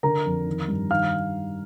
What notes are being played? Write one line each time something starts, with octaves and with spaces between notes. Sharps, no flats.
D3 A#4 A#5
F2
D#3
G2
D#3 F5 F6